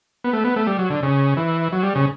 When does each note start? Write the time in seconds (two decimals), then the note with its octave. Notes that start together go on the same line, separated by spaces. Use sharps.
0.24 B3
0.33 A3
0.44 B3
0.56 A3
0.67 G3
0.79 F#3
0.90 D3
1.03 C#3
1.37 E3
1.72 F#3
1.83 G3
1.95 C#3